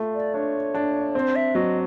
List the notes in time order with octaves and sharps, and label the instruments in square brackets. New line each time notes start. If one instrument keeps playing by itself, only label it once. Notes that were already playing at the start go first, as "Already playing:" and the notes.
Already playing: [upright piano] A3 F4
[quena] D5
[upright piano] D4 [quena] C#5
[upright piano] D4
[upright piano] C4 [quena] C5
[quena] E5
[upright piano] F#3 [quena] D#5